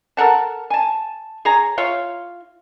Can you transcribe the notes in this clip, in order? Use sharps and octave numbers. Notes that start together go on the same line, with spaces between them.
A4 A#4 F#5 A5
G#5 A5
G#4 C#5 A#5
E4 F4 C#5 F5